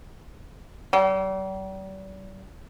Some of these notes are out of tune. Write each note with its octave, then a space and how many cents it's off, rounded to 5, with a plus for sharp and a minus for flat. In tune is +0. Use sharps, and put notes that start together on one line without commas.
G3 -40